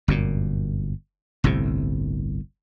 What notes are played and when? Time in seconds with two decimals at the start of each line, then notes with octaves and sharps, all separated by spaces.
0.08 G1 F#2 A#2
1.44 G1 C2 A2 C3